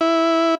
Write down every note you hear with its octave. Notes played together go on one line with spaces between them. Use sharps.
E4